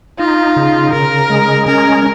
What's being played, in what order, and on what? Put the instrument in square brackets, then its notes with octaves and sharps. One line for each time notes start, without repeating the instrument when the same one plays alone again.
[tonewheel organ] D#4 [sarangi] F4
[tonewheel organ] C#3
[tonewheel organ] C#3 [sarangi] A#4
[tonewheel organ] G#3
[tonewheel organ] C#4 [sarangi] A#4